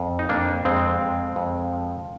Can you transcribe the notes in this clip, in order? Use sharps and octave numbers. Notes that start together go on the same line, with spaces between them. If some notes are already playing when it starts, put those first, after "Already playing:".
Already playing: F2
D#4
F2 A#3 D4
F2 G#3 C4
F2
F2
F3